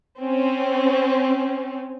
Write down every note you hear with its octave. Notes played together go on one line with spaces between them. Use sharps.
C4 C#4